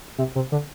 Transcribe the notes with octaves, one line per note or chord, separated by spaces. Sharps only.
C3
C3
D3